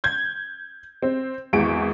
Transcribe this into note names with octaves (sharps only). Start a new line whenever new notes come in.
G6 G#6
C4
G#1 E2 C#6 D7